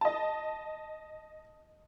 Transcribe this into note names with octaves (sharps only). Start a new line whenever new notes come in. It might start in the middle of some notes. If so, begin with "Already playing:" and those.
D#5 A5